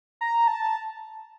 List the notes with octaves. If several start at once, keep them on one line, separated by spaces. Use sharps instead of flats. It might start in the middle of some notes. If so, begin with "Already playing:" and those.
A#5
A5